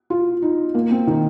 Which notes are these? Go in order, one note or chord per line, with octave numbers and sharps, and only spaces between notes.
F4
D#4
A#3
C4
D#3